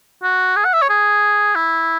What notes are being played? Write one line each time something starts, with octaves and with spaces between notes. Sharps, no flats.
F#4
G#4
F#5
E5
C#5
G#4
E4